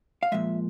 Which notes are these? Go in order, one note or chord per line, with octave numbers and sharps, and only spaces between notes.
F5
A#2 F3 G#3 E5